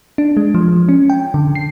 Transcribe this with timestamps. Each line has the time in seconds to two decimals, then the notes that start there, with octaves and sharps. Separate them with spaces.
0.18 D4
0.37 G#3
0.55 F3
0.89 C#4
1.10 G5
1.34 D3
1.55 C7